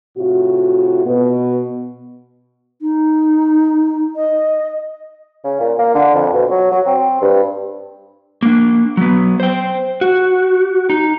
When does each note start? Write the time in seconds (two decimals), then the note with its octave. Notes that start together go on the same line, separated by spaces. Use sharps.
0.18 A2 C3 F4 F#4
1.06 B2 B3
2.82 D#4
4.16 D#5
5.44 C#3
5.60 A#2
5.79 A#3
5.94 D3
6.14 F2
6.33 B2
6.50 F#3
6.71 F#3
6.87 C4
7.22 G2
8.42 A#3 D4
8.97 F#3 B3
9.40 C5 G5
10.01 F#4
10.90 D#4